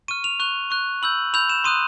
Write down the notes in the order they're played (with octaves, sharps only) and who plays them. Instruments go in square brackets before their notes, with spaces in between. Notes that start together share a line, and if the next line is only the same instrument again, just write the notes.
[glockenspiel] C#6 F6 D#7
F7
C#6 F#6 F7
C#6 F#6
B5 E6 G6 F#7
B5 E6 G6 F7
E7
C6 D#6 F#6 D#7